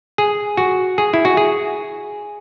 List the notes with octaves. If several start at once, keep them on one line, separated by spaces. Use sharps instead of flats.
G#4
F#4
G#4
E4
F#4
G#4